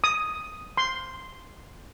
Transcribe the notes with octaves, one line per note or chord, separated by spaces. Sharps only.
D#6
C6